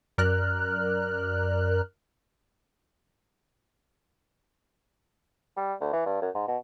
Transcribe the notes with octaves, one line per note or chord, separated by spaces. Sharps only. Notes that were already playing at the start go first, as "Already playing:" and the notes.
F#2 A#4 D5 F6 F#6
G3
D2
E3
G2
F#2
G#2
B2